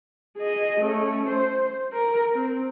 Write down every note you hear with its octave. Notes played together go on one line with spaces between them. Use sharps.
G#4 D#5
A3 C#4
C5
A#4
C4